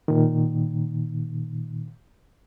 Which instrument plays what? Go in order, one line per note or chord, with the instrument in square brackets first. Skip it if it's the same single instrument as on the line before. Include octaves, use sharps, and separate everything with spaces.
[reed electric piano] A#2 D#3